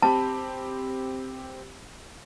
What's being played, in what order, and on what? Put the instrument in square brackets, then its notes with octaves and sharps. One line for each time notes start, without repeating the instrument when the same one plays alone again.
[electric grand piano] C4 G4 B5 [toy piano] A5